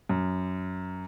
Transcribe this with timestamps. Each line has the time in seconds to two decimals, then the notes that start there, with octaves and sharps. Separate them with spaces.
0.09 F#2